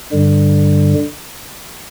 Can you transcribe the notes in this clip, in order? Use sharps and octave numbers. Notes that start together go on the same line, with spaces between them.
G2 D3 G3